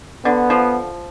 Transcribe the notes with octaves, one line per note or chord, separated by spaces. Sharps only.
D3 B3
F3